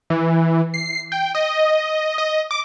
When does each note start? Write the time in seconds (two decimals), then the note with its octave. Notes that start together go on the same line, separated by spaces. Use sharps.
0.10 E3
0.74 C7
1.12 G5
1.35 D#5
2.18 D#5
2.51 D6